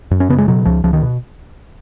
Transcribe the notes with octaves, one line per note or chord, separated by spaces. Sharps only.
F#2
C#4
C#3 B3
G#3
B2 F#3
C#2 F3
C#2 F3
D#3
B2